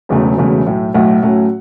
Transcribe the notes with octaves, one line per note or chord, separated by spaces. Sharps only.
E1 E2 C#3 F#3 A3
E1 E2 C#3 F#3 A3
B1 A2 A3
B1 A2 A3 F#5
A2 F#3 A3 C#4